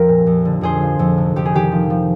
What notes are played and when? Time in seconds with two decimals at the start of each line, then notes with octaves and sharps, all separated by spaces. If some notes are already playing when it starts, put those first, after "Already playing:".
Already playing: F2 F3 F4 G4 A#4
0.08 A#2
0.26 F2
0.45 D3
0.61 F2 G#4 C5
0.82 F3
0.99 F2
1.18 C3
1.36 F2 G4
1.45 G#4
1.54 D#3 G4
1.72 F3
1.90 F3